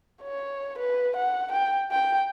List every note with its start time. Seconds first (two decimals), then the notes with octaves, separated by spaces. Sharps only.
0.22 C#5
0.78 B4
1.16 F#5
1.52 G5
1.92 G5